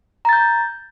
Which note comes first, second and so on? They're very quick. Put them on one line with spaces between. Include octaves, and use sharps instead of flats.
A#5 A6 G6